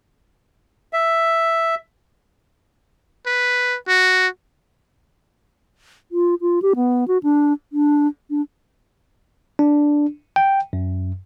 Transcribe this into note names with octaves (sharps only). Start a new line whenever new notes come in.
E5
B4
F#4
F4
F4
G4
B3
F#4
D4
D4
D4
D4
G5
F#2